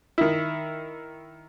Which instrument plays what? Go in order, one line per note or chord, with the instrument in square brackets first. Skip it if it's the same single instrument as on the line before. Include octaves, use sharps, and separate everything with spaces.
[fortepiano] D#3 E4